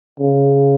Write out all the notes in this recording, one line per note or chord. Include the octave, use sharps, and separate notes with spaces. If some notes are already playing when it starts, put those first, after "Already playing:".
C#3